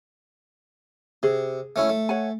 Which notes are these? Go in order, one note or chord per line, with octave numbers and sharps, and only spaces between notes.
C3 G#4
A3 C#4 E4
A3
C#5 F#5 G#5